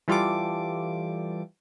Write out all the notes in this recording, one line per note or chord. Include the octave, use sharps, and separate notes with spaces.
E3 G3 F4 G4 A4 D6